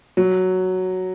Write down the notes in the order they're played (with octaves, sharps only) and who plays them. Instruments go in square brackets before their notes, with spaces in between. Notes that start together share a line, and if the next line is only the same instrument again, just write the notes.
[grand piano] F#3